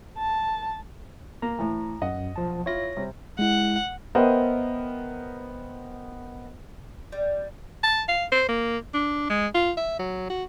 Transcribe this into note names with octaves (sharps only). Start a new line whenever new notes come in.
A5
A#3 A#5
A2 E3
F#2 D#5 F#5
B1 F3 A5
E4 F4 C#5 A#6
C3 G3
G#3 E4 F#5
B3 A#4 C5 D#5 E5 G5
G3
A5
F5
C5
A#3
D4
G#3
F4
E5
F#3
F#4